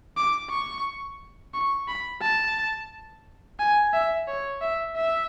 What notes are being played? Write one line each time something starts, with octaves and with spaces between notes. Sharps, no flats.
D6
C#6
C#6
B5
A5
G#5
E5
C#5
E5
E5